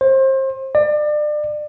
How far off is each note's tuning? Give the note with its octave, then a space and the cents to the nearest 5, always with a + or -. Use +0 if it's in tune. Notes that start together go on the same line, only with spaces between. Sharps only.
C5 +30
D5 +30